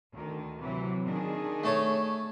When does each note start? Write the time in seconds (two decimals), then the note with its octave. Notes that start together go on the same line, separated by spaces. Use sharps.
0.11 D2 D#3
0.59 C3 E3 F#3
1.06 D#3 D4 G#4
1.64 A3 A4 C#5